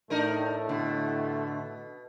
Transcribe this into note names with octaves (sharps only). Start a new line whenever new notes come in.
A2 A3 D4 D#4 A#4
B2 D3